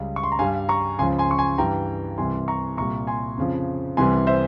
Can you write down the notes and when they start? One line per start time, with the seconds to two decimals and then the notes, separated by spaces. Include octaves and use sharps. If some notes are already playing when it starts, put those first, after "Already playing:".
Already playing: C#2 C#3 G3
0.16 C#6
0.24 C6
0.32 A#5
0.39 G2 G3 F5 G#5
0.69 A#5 C#6
0.99 C#2 C#3 F3 G#5 C6
1.18 G#5 C6
1.31 C#6
1.38 G#5 C6
1.58 G2 E3 G3 G5 A#5
2.18 C2 C3 E3 G3 G#5 C6
2.48 A#5 C#6
2.77 C2 A#2 G3 A#5 C#6
3.07 G#5 C6
3.37 F2 C#3 F3
3.97 C2 C3 E3 G3 G#5 C6
4.27 C5 E5